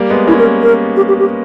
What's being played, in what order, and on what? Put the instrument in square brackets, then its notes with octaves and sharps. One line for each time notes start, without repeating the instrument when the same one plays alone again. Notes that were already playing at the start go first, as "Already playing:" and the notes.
Already playing: [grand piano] G3 A#3
G#3 B3
[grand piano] A#3 C#4 [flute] E4
[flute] A#4
A#4
G4
G4
G4